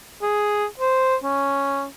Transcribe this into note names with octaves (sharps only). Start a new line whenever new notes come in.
G#4
C5
C#4